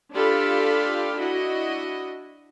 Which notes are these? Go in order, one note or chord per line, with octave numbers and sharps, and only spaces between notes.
D4 F4 G4 A4 F5 B5
D4 E4 F#4 D#5